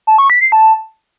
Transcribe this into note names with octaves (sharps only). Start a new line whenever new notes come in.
A5
C#6
B6
C7
A5